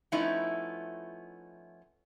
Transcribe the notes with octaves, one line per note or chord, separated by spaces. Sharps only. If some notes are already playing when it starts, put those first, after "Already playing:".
F3 A3 B3 C#4 D#4 E4